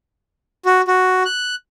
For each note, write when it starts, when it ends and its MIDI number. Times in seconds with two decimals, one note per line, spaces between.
0.65 0.81 66
0.88 1.23 66
1.25 1.55 90